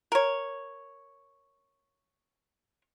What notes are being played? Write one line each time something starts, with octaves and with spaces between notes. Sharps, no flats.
A#4 C#5